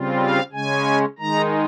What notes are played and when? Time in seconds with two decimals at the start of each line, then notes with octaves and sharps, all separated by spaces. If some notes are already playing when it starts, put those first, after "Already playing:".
Already playing: C#3 G3 C4 F4
0.20 F5
0.52 C#3 G#3 C#4 G#5
1.18 D#3 G#3 D#4 A#5